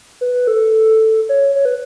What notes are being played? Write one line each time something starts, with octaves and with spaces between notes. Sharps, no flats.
B4
A4
C#5
C#5
B4